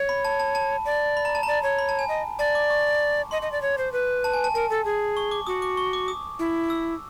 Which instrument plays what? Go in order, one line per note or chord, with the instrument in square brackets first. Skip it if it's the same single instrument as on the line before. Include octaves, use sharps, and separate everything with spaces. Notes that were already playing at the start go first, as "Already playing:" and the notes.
Already playing: [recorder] C#5
[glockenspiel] B5
A5
A5
A5
[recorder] D5
[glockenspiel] B5
A#5
A5
[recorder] D5 [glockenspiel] A#5
[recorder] C#5
[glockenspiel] B5
A5
G#5
[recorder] D#5
[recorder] D5 [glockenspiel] A5
[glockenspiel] D6
C#6
[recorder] D#5 [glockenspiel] C6
[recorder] D#5
D5
C#5
C5
B4
[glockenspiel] A5
G#5
A5
[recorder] A#4 [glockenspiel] A5
[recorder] A4
G#4
[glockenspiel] C#6
D6
[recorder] F#4 [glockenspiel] D#6
[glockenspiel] D6
C#6
D6
D#6
[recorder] E4
[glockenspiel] E6